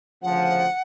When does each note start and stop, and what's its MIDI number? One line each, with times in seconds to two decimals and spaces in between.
0.22 0.67 38
0.22 0.67 49
0.22 0.67 53
0.22 0.82 78